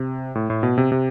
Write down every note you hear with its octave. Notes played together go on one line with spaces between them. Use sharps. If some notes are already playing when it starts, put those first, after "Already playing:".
Already playing: C3
A2
A2
B2
C3
C3